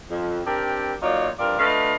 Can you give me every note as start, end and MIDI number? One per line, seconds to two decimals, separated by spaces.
0.11 0.41 41
0.47 0.94 60
0.47 0.94 62
0.47 0.94 67
0.47 0.94 70
1.02 1.29 54
1.02 1.29 58
1.02 1.29 63
1.02 1.29 65
1.02 1.29 73
1.02 1.29 74
1.39 1.57 43
1.39 1.57 53
1.39 1.57 60
1.39 1.57 65
1.39 1.57 70
1.39 1.57 74
1.59 1.96 57
1.59 1.96 62
1.59 1.96 65
1.59 1.96 71
1.59 1.96 75
1.59 1.96 77